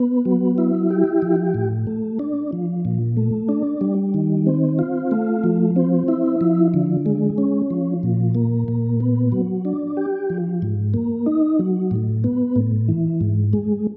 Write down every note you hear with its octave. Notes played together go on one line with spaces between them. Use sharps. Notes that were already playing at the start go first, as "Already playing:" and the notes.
Already playing: B3
F#3
E4
G4
F3
A2
A3
D4
F3
A#2
A3
D4
G3
D#3
C4
F4
A3
F3
C4
E4
F3
D3
G#3
C#4
F3
A#2
A#3
A#2
B3
F#3
D4
G4
F3
G#2
A#3
D#4
F#3
A2
B3
A2
E3
G#2
G#3